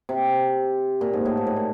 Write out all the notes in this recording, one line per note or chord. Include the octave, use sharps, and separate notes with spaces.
C3
A#2
G#2
A2
G#2
A2
A#2